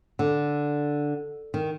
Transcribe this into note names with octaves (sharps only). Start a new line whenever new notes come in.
D3
D#3